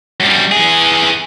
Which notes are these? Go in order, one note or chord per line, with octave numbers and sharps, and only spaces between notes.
F#2 G3
E3 G#4